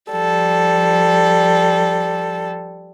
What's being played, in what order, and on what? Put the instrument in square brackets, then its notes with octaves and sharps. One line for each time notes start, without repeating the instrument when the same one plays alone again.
[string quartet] F3 G3 A4